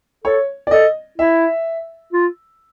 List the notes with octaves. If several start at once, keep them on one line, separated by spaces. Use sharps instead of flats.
A4 C#5
D5
A4 D#5
E4 E5
F4